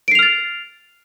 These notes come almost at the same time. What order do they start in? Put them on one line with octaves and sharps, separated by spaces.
D7 C7 F7 F6 A6